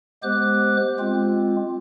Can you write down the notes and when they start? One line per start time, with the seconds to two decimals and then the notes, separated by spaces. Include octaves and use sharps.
0.23 G#3 B3 G4 C5 D6 F#6
0.99 G#3 C4 F4